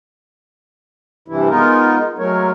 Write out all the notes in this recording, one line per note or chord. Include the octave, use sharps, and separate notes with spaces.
G2 C3 E3 E4
G#3 B3 D#4 F4 A#4
F#3 G#3 A3 A#4 C#5